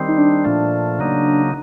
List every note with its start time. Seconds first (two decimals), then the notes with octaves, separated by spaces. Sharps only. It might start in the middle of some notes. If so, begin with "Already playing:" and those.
Already playing: D#3 G3 C4
0.08 D#4
0.18 D4
0.45 A#2 F3 A3
0.99 C#3 F#3 A#3 D#4